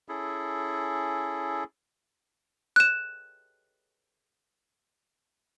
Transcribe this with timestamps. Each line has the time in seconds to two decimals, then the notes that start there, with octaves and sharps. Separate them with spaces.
0.09 C#4 E4 G#4 A4
2.76 F#6 E7